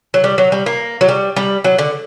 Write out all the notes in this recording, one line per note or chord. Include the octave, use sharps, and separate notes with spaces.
F#3
G3
F#3
G3
A#3
F#3
G3
G3
F#3
D3